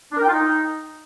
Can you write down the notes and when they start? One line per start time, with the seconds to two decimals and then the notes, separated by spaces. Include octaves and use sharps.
0.12 D4
0.17 A#4
0.22 G5
0.27 F4
0.32 D#4